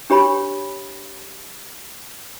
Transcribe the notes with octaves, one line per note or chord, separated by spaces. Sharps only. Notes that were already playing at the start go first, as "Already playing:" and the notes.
D4 G4 C#5 B5